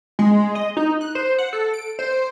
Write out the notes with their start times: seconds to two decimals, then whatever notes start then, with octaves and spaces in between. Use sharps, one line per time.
0.19 G#3
0.55 D#5
0.77 D#4
1.01 F#6
1.15 C5
1.38 F#5
1.53 A4
1.73 D7
1.99 C5